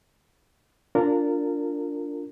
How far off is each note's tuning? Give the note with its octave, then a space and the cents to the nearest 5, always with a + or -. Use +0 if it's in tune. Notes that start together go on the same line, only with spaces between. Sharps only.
D4 -10 F4 +0 A#4 -25